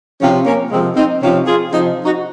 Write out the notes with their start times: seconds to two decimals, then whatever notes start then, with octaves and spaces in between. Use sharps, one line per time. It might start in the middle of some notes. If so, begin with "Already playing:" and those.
0.21 C3 F3 C#4 F4
0.45 A#3 C#4
0.71 C3 F3 G#3 C4
0.96 C4 D#4
1.21 C3 F3 C#4 F4
1.46 F4 G#4
1.71 C3 F3 C4 D#4
2.05 D#4 F#4